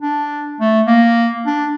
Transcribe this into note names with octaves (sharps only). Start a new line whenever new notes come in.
D4
A3
A#3
D4